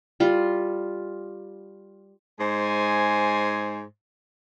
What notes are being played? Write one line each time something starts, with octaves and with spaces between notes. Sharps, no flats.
G3 F4
G#2 G#3 G#4 C5 G#5